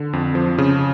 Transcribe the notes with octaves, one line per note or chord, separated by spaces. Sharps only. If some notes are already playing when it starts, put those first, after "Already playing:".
Already playing: D3
F2
F3
C#3